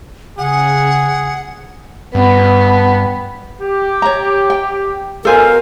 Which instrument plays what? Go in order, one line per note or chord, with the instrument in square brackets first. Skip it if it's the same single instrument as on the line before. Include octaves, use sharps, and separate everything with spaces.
[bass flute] C#3 [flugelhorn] G#4 [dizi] F#5
[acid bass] G2 [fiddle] B3
[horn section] G4
[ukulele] C#5 A#5
G5
[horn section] B2 C5 F5 [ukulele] A4 G#5 [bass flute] A#4